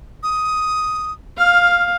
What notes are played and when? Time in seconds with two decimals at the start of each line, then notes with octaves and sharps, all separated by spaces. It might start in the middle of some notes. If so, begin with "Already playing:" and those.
0.23 D#6
1.38 F5 F6